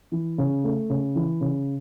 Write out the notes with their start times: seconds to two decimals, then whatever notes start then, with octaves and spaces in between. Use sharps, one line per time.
0.12 E3
0.38 C#3
0.64 A3
0.90 C#3
1.15 E3
1.41 C#3